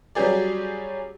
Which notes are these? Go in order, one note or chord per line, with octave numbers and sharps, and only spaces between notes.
F#3 G3 C#4 G4 G#4 D5